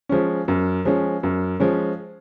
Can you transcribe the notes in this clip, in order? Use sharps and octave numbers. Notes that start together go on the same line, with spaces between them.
F3 G#3 C#4
F#2
F3 G#3 C#4
F#2
F3 G#3 C#4